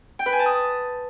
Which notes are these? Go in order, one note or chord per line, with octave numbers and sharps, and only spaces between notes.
G5
B4
G#5
A5
D#6